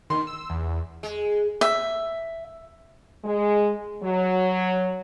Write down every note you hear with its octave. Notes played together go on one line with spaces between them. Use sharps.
D#3 C6
E6
E2
G#3
E5
G#3
F#3